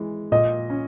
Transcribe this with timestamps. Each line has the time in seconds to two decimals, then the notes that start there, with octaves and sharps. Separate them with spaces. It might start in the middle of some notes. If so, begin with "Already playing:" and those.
Already playing: E3 G#3
0.32 A#2 D#5
0.70 C#4